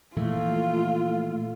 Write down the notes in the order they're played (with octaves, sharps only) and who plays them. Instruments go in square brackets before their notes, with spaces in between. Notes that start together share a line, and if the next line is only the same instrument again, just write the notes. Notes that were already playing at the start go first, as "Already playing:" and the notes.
[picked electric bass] A#2 E3 F3 [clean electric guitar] A3 [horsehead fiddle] F4